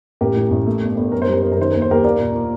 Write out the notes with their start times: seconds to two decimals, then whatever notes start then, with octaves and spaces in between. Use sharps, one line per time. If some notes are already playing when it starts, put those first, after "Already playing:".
0.21 A1 G4 A#4
0.36 A2
0.51 A1
0.66 A3
0.81 G1
0.97 G1
1.12 F#2 A#4
1.22 C5
1.27 G3
1.33 A#4
1.42 F#2 C5
1.52 A#4
1.58 D#3 C5
1.72 D#2 A#4
1.82 C5
1.90 D#2 G4 A#4
2.04 A#3 A#4 D5
2.20 A#2
2.35 A#2